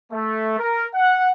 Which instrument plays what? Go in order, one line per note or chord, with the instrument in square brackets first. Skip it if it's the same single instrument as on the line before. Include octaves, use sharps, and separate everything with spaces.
[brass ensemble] A3
A#4
F#5